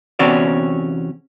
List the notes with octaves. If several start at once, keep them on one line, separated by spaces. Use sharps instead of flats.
E2 C3 C4 C#4 F#4 D5